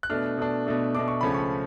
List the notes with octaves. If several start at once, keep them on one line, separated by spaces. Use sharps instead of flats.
F#6
B2 A3 D4 F6
B2 A3 D4
B2 A3 D4
B2 A3 D4 D6
C#6
C#2 C#3 F3 A3 C#4 B5
C#6